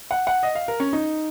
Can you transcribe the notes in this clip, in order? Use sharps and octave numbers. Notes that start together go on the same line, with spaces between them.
F#5
F#5
D#5
F5
A#4
C#4
D#4